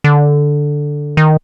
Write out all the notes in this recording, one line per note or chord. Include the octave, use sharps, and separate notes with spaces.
D3
D#3